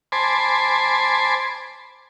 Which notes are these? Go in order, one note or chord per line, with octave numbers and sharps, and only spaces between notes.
C5 G#5 A5 B5 C6 D6